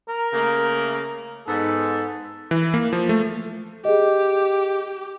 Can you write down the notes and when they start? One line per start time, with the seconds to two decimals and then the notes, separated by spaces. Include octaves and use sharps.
0.08 A#4
0.33 C#3 A3 A#3
1.47 G#2 B3 A4
2.51 E3
2.74 A#3
2.93 F3
3.09 A3
3.85 G4 G#4 D#5